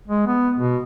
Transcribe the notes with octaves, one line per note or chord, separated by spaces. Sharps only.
G#3
B3
B2